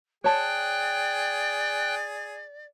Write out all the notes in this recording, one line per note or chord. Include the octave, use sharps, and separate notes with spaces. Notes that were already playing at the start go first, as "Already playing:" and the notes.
G#4 C#5 D5 G5 A5 F#6